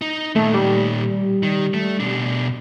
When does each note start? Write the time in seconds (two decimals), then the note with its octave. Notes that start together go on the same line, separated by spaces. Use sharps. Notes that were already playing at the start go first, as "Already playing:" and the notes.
0.02 D#4
0.36 A#2 D#3 A3
0.54 G3
1.43 D#3
1.74 A3
2.00 B2 D4